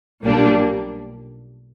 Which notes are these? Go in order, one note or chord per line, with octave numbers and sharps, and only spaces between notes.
B1 A#2 G3 A#3 D4